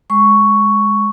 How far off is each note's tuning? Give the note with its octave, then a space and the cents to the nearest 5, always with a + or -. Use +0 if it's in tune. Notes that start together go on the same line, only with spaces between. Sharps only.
G#3 +0 C#6 +5